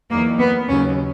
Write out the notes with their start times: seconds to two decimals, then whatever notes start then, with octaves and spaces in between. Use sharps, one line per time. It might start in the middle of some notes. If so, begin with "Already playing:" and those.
0.10 E2 D#3 F#3 A#3
0.39 B3
0.68 D#2 C#3 F#3 C#4